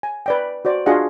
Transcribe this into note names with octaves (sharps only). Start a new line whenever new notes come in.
G#5
B4 D5 G5
F#4 C5 D5
D4 F4 F#4 G#4 D#5 F#5